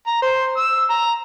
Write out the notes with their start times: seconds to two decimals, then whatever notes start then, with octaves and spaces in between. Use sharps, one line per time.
0.07 A#5
0.22 C5
0.57 E6
0.90 A#5